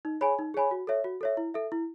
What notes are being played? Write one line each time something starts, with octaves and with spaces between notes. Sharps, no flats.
D#4
G#4 C#5 G#5 B5
D#4
G#4 C#5 G#5 B5
F#4
A4 C#5 E5
F#4
A4 C#5 E5
E4
A4 E5
E4